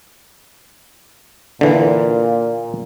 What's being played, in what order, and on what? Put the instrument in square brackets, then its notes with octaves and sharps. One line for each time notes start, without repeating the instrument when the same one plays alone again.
[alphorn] A#2 [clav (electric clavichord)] D3 E3